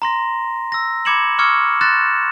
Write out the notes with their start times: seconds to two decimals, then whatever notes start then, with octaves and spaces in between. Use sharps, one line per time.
0.02 A#5 C6 A#6
0.72 E6 A#6
1.05 B5 D6 G#6 C#7 E7 F#7
1.38 C#6 D6 E6 F6 G#6 C#7
1.81 C6 F#6 A6 A#6 E7